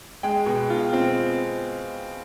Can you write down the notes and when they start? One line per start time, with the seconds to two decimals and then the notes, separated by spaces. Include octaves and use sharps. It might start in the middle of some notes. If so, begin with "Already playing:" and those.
0.23 G#3 G5
0.46 B2
0.70 F4
0.93 C4